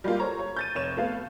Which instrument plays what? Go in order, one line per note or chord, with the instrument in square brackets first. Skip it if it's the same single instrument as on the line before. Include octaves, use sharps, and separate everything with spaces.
[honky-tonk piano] G3 G#3 A#3 F4
A4 C5 C#5 A#5
C#5
G6 A6 D#7
F1 C#5 E7
A3 B3 F5